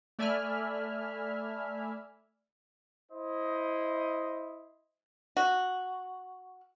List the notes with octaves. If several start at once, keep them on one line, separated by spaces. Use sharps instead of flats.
A3 D5 E5 G#5 B5 F6
E4 C5 D#5
F#4